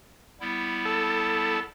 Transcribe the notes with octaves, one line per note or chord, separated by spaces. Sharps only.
G3 B3 E4
A4